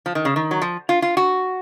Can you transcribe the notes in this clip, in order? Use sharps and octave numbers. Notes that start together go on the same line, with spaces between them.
F3
D#3
C#3
D#3
F#3
F3
F4
F4
F#4